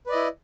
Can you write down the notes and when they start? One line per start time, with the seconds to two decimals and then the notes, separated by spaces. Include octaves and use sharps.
0.06 B4
0.09 D5
0.12 D#5
0.15 E4